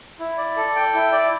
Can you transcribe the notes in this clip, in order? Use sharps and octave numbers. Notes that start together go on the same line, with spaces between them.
E4
D5
A4
G5
E4
D5